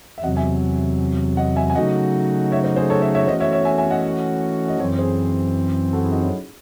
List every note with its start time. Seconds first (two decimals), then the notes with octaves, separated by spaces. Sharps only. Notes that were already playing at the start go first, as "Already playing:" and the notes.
0.18 E5
0.23 E2 C3 F#3 D#5 F#5
0.37 E5 G#5
1.37 D#5 F#5
1.56 E5 G#5
1.70 G#5
1.75 C#3 F#3 A3 D#4 F#4 D#5 F#5
2.52 C#5 E5
2.64 C5 D#5
2.76 G#4 C5
2.90 A4 C#5
3.02 C#5 E5
3.15 C#5 E5
3.27 E3 A3 C#4 F#4 C5 D#5
3.40 C#5 E5
3.52 C#5 E5
3.65 E5 G#5
3.78 E5 G#5
3.91 D#5 F#5
4.68 D#5
4.79 F#2 E3 C4 A4 C#5
4.98 G#4 C5
5.93 F#4 A4
6.03 E4 G#4
6.12 D#4 F#4
6.21 C#4 E4